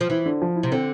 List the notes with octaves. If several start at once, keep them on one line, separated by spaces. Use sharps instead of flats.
F3
E3 E4
D3
F3
E4
C3
D3 C4